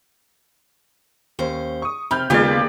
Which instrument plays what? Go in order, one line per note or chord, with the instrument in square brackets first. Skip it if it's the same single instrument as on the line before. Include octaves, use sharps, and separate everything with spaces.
[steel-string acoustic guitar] D#2 C#4 C5
[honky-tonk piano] C#6 D#6
[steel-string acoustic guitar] C3 [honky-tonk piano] B5 F6 G6
[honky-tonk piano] D#2 G#3 [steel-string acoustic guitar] C#3 B3 F4 [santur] G4 G#4 D5